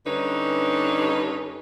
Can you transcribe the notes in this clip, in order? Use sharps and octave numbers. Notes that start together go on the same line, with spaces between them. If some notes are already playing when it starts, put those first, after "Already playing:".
G2 D3 C#4 D#4 B4